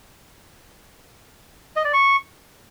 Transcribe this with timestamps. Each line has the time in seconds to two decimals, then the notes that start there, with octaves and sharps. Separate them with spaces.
1.76 D#5
1.85 D5
1.93 C#6